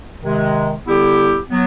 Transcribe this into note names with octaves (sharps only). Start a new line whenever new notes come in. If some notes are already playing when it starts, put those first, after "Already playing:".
C3 D#3 G#3
D3 G3 B3 E4 G4
F#3 B3